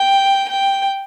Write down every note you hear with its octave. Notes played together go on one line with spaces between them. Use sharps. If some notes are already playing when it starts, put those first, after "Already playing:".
Already playing: G5
G5